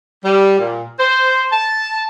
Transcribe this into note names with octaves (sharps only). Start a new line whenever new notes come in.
G3
A#2
C5
A5